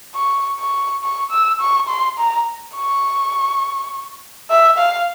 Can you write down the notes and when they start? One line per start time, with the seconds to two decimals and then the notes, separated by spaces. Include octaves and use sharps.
0.16 C#6
0.60 C#6
1.03 C#6
1.31 E6
1.60 C#6
1.89 C6
2.19 A#5
2.76 C#6
4.50 E5
4.78 F5